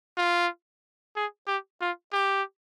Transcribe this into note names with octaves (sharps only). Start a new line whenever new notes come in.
F4
G#4
G4
F4
G4